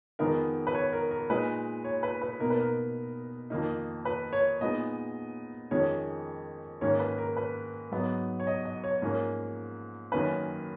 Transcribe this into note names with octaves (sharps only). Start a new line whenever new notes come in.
F2 D#3 G#3 B3 D#4 A#4
B4
C#5
A#4
A#4
A#2 G#3 D#4 B4
C#5
B4
B4
B2 A#3 D#4 A#4
B4
A#4
F2 D#3 A#3 D#4
B4
C#5
A#2 G#3 B3 D#4 D#5
F2 D#3 G#3 C#4 C#5
G#2 D#3 A#3 C#4 C#5
B4
A#4
B4
G#2 F#3 B3 D#4
C#5
D#5
D#5
C#5
G#2 F3 A#3 C#4
F#2 D#3 A#3 C#4 B4